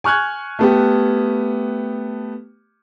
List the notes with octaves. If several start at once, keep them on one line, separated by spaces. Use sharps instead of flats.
G#5 C#6 F6 F#6 G#6
A3 B3 G4